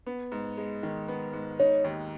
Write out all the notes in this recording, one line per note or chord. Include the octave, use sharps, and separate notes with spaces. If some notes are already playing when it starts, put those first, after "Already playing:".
B3
G#2
G#3
D#3
B3
G#2
D#4 C#5
D#2